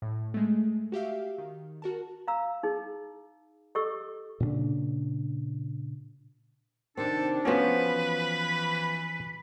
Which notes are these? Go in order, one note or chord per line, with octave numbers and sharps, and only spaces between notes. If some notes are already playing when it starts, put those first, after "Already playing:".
A2
G#3 A3
F#4 G4 E5 F5
D#3
F#4 A#4 A5
F5 A#5 E6
D#4 G#4
G4 A4 D#5 C#6 E6
A#2 C#3 C4 D4
C3 D#3 C4 D4 A4
F3 B3 C#4 F#4 B4 C5
E3 B5